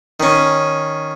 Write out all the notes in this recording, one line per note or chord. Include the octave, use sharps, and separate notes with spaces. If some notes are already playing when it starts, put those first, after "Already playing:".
D#3 C#4